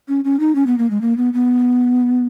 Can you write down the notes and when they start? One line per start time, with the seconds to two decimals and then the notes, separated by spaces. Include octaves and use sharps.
0.08 C#4
0.24 C#4
0.40 D#4
0.55 C#4
0.67 B3
0.78 A#3
0.90 G#3
1.01 A#3
1.17 B3
1.33 B3